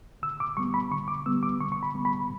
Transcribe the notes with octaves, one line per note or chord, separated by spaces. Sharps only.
D3 E6
D6
G3 B3 C#6
B5
D3 C#6
D6
G3 B3 E6
D6
D3 C#6
C#6
B5
G3 B3
B5